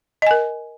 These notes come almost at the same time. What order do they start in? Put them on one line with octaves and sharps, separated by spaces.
D#5 G#5 A#4